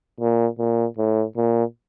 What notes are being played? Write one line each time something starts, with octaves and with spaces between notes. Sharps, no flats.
A#2
A#2
A2
A#2